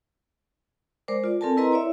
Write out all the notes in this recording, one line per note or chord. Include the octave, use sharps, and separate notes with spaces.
G#3 A#4 C5 D5 D6
F4 D5
C4 A4 A#4 G#5 A5
E4 A#4 B4 D#5 A#5 C6
E4 C#5 D5 E5